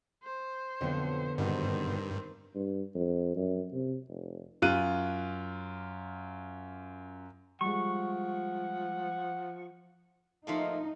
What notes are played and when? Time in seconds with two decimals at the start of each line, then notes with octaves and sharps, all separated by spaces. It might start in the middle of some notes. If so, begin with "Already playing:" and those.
0.23 C5
0.81 B1 F2 D3 B3 G5
1.38 G#1 G2 B2 D#3 C4
2.55 G2
2.95 F2
3.36 F#2
3.73 C3
4.09 F1
4.62 F#2 F4 F#6 D#7
7.61 F3 G3 G#3 F#5 C#6
10.47 F3 A3 A#3 D#4